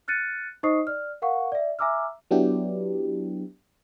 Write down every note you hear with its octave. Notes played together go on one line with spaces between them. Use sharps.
F6 F#6 A6 C#7 D#7
D#4 C5 D#5 C#6 D#6 C7
D5 F6
A#4 F5 F#5 C#6
D5 E5
E5 G#5 A#5 D6 E6 F6
F#3 B3 D4 E4 G4